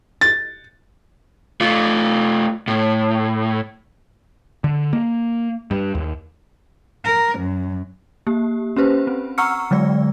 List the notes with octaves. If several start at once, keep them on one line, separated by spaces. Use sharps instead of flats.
A6
A3 F4
A2
D3
A#3
G2
D#2
A#4
F#2
A#3 G4
C#4 G4 B4 C5
C4
F#5 A#5 C#6 E6 F6 C#7
D3 F#3 G#3 D5